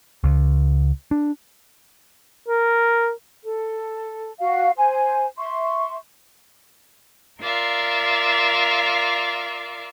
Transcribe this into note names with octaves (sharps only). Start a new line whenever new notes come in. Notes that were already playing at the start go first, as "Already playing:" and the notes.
C#2
D4
A#4
A4
F#4 F5
C5 G#5
E5 C6 C#6
F4 A#4 D5 E5 F5